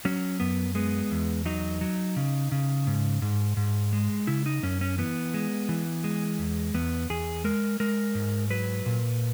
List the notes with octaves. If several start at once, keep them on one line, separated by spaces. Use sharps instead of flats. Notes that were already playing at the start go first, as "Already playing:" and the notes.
F#3 C#4
F#2 B3
G#3 B3
E2
F#3 D#4
F#3
C#3
C#3
G#2
G#2
G#2
G#3
C#3 E4
D#4
F#2 C#4
C#4
E3 B3
G#3
E3
G#3
E2
E2 B3
E2 G#4
G#3 A#4
G#3 A#4
G#2
F#3 B4
A#2